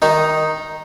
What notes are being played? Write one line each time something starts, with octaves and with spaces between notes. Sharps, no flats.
D#3 D#4